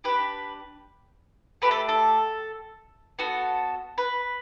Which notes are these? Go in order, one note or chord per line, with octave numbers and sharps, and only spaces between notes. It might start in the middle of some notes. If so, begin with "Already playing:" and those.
D4 G4 B4
A3 D4 G4 B4
A4
A4
B3 F#4 A4
B4